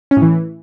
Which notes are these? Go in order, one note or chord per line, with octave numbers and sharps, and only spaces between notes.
C#4
A2
E3